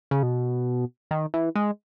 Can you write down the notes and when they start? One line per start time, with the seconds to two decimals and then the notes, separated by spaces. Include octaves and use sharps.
0.11 C#3
0.23 B2
1.11 D#3
1.34 E3
1.56 G#3